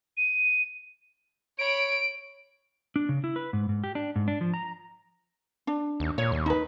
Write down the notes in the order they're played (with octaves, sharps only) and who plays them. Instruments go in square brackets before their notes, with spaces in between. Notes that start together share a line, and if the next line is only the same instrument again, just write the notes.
[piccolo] D#7
[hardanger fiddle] C#5 B5 [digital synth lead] D7
[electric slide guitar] D4
C#3
E4
B4
G#2
G#2
G4
D4
G#2
D4
F3
A#5
[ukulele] D4
[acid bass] D#2
[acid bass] A#2 [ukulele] C#5
[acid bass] D#2
[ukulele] D#4 B4